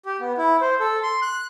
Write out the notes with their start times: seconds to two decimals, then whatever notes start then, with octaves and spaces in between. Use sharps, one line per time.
0.05 G4
0.20 B3
0.38 E4
0.61 C5
0.80 A4
1.03 C6
1.22 F#6